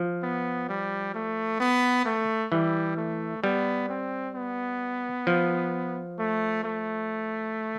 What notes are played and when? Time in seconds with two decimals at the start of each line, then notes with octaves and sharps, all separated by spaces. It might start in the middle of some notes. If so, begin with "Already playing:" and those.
Already playing: F3
0.23 B3
0.69 G3
1.14 A3
1.60 B3
2.06 A3
2.52 E3 G3
2.97 A3
3.43 G3 B3
3.89 C4
4.35 B3
5.27 F3
6.19 A3
6.64 A3